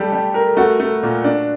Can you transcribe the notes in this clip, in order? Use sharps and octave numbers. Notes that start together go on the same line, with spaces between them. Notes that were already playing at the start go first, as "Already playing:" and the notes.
Already playing: G3 A3 G4 A4
G3
A#4
A3 F#4
A3
A#2
D4